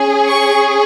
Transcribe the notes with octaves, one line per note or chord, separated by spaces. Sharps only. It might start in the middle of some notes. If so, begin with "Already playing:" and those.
Already playing: C#4 G#4
C#6